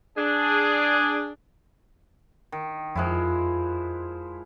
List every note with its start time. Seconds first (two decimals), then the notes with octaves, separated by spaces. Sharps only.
0.18 D4 G#4
2.52 D#3
2.96 F2 F3 G#3 E4